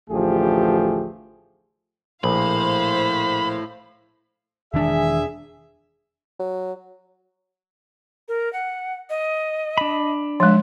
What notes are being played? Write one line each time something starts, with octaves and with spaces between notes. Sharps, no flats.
A1 D2 F3 A3 G4 G#4
A#1 A2 C5 F5 B5
E1 D#3 E3 G#3 D4 G#4 E5
F#3
A#4
F#5
D#5
D4 B5
F3 G#3 E5